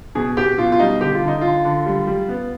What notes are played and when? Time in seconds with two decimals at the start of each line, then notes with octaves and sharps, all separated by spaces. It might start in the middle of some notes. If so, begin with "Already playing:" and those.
0.15 B2 G#4
0.37 B2 G4
0.58 B2 F4
0.72 F4
0.79 G3 D#4
1.01 D3 G4
1.14 F4
1.22 D3
1.28 D#4
1.41 D3 F4
1.65 D3
1.86 G3
2.07 G3
2.29 B3